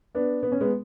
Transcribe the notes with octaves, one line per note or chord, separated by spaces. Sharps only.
B3 D4
B3
C#4
G#3 B3